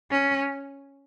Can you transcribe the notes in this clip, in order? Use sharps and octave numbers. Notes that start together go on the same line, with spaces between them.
C#4